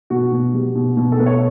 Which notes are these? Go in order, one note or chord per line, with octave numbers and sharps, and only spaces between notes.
B2 F#4
B2
G3
B2
B2
A4
B2 B4
C#5